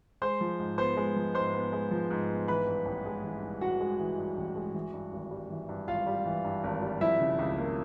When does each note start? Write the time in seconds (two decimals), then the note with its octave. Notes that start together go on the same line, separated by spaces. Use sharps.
0.22 G#3 C5 C6
0.41 F3
0.59 G#2
0.78 B3 C5 C6
0.97 G#3
1.16 F3
1.34 G#2 C5 C6
1.54 B3
1.73 G#3
1.91 F3
2.10 G#2
2.29 B3
2.48 E3 B4 B5
2.67 G2
2.86 A1
3.05 G#3
3.24 E3
3.43 G2
3.61 A1 F#4 F#5
3.80 G#3
3.99 E3
4.18 G2
4.37 A1
4.56 G#3
4.74 E3
4.93 G2
5.13 G#1
5.31 G3
5.50 E3
5.69 G2
5.88 G#1 F4 F5
6.07 G3
6.26 E3
6.45 G2
6.64 G#1
6.82 G3
7.01 F3 E4 E5
7.20 C#3
7.39 C#2
7.58 A#3